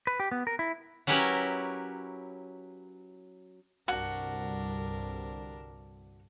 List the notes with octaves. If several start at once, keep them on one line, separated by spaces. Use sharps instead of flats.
B4
G4
B3
A#4
E4
F#3 C#4 E4 G4 A#4 B4
C2 G2 D3 D4 F#4 A#4